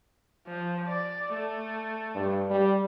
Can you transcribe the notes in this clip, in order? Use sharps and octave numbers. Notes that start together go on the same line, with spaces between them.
F3
D5
A3
G2
G3